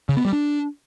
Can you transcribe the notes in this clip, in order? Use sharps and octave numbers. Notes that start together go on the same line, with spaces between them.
C#3
B3
G3
D4